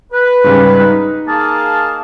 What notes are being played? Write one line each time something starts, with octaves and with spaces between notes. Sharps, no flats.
B4
G#2 C#3 G3
D#4
A#3 G#4 A5